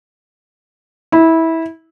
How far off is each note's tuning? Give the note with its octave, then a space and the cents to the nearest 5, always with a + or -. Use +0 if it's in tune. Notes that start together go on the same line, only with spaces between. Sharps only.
E4 -20